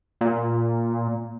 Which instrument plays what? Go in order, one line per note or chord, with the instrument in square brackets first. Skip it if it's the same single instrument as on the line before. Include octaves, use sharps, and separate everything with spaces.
[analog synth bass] A#2